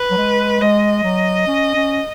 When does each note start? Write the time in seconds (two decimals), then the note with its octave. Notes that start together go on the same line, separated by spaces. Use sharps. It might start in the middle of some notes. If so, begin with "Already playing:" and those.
Already playing: B4
0.11 F#3
0.18 G#3
0.60 G#3 D#5
1.04 F#3
1.47 C#4
1.75 C#4